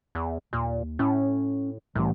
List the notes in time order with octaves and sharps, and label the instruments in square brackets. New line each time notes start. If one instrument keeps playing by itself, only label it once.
[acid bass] E2
[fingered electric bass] D#2 [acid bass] A#2
[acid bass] A2 [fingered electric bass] C#4
[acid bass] C2 [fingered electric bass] A2 E3